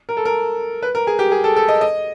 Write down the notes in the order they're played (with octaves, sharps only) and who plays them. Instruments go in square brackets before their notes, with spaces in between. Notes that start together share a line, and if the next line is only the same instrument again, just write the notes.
[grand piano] A#4
A4
A#4
B4
A#4
G#4
G4
G#4
A4
A4
D#5
D#5